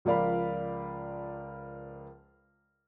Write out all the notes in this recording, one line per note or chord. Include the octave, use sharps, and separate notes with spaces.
C#2 F3 A#4 D5 F5 B5